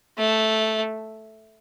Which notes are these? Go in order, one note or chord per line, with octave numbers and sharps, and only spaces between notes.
A3